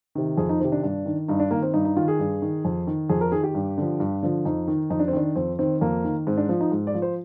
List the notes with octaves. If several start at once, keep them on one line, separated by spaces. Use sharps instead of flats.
C3 D#3
F2 G#4
D#4
C3 D#3 C4
D4
G2 D4
D#3
G2 D#4
D4
D#3 A#3
C4
G2 D#4
D#4
D#3 F4
G#4
G2
D#3
F2
D#3
F2 G#4
A#4
D#3 G#4
G4
G2
D3 F3
G2
D3 F3
F2 D#4
D#3
F2 D#4
D4
C4
D#3 D4
F2 C4
D#3 C4
F2 A#3
D#3
G#2 C4
D4
F3 D4
D#4
G#2
D5
F3
C5